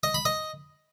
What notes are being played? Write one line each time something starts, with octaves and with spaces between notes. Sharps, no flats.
D#5
B5
D#5